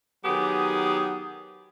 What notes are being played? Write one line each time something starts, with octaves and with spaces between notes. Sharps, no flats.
D#3 F#3 B3 G4 G#4